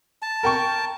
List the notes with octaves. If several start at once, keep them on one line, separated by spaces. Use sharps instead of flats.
A5
A#4 G5 C#6